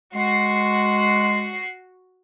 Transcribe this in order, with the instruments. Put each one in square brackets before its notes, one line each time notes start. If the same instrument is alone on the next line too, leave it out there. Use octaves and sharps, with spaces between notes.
[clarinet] G#3 [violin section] F#4 C7